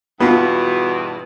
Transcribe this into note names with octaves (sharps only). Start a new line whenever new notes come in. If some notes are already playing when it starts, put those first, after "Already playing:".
E2 G2 B2 B3 F4